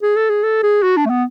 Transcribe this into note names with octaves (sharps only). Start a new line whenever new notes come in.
G#4
A4
G#4
A4
G#4
F#4
D4
A3
B3